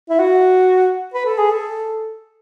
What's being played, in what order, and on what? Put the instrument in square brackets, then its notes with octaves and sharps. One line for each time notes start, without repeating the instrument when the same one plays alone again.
[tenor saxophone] E4
F#4
B4
A4
G#4
A4